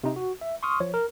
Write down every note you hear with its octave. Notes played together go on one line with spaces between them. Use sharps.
C3 D#4
F#4
E5
C6 C#6 D#6 F6
F3 C#5
A#4